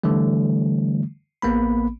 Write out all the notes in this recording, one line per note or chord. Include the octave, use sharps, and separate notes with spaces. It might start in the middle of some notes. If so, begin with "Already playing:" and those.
D3 E3 G3 A3
A1 A#3 B3 B5